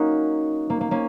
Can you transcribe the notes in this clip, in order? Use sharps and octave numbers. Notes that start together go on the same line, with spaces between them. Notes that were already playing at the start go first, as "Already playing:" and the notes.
Already playing: A#3 C#4 D#4 F#4 A#4
A#3
A#3
A#3 C#4